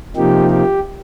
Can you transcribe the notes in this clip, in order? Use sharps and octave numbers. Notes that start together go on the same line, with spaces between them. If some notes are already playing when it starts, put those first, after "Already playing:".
C3 F3 A#3 D#4 G4
G4